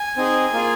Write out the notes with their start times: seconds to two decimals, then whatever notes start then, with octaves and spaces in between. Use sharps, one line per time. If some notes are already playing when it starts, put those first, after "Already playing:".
Already playing: G#5
0.17 C4 D#4 G#4
0.53 A#3 F4 G#4